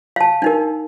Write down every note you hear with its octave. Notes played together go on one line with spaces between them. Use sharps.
F5 A5
D4 D#4 A#4